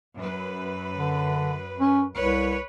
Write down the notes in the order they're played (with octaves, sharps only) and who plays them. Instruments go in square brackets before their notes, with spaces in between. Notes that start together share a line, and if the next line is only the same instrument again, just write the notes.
[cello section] F#2 B4
[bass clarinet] D3
C#4
[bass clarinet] C2 [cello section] B4 C#5